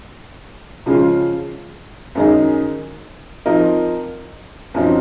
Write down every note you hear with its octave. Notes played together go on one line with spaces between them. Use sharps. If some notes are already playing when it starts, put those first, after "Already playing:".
C#3 F3 G#3 C#4 F4
F#2 D#3 G#3 D#4 G#4
F3 C4 D#4 A#4
F#2 F3 C4 D#4